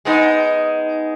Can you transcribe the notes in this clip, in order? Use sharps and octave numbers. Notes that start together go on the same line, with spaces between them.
G#3 B3 D#4